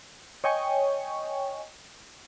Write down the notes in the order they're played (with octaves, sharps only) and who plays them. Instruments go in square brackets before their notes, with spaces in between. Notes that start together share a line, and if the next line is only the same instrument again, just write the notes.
[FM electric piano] C#5 D#5 G5 G#5 C#6